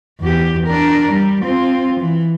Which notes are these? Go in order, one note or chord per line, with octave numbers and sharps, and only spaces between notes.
E2 G4
D4 A#4
G3
C4 F4
E3